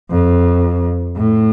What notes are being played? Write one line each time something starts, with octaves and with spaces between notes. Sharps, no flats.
F2
A2